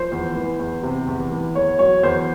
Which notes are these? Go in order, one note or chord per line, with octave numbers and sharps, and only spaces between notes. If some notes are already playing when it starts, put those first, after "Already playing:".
Already playing: F3 C5
E2
E3
E2
C3
E2
E3
E2 C#5
F#3 C#5
E2 C5